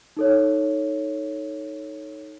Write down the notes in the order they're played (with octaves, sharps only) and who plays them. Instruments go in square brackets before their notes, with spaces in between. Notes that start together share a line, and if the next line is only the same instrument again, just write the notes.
[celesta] D#4 A4 C#5